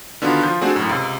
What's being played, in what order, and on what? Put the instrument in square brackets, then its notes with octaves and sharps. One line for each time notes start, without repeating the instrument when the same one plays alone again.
[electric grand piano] D3 D#3 B3 D4 F4 F#4
F3 F4 G6
A3 C4 D4 F#4 G#4
F#2 A2
C#2 C3